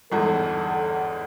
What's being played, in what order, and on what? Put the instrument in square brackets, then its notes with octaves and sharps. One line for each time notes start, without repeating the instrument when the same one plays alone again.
[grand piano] G1 E2 G#2 [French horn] A4